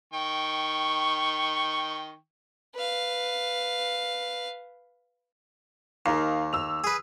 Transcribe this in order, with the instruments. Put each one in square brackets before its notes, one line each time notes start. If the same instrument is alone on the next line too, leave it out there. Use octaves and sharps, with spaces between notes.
[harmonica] D#3 G5 C#6
[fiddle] B4 F5
[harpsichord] D#2 [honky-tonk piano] D#4 A#4 F5
[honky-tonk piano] E6 F7
[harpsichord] G#4 B4